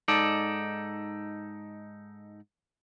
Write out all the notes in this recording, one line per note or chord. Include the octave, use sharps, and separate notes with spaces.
G#2 D#4 A4 D5